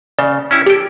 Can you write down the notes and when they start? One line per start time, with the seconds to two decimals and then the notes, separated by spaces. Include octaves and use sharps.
0.19 C#3 D5
0.51 C#4 E4 G4
0.66 G4 A4 D7